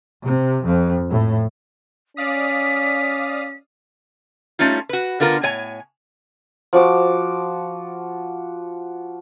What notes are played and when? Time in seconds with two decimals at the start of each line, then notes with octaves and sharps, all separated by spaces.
0.25 C3
0.65 F2
1.09 A2
2.17 C#4 D5 F5 D#6 B6
4.59 G3 A3 C#4 D#4 F4
4.89 F#4 B4
5.20 D3 B3 F4 A#4
5.43 A2 C#5 G#5
6.73 F3 F#4 C5 D6